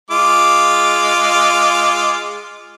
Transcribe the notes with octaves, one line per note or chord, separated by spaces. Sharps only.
G#3 F4 D6